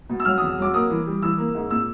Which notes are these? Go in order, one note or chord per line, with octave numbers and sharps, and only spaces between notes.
B2
E6
F#3 F6
D#6
E2
F#3 D6
A#3 D#6
E3
G3
E3 E6
A#3
G#2
A#2 E6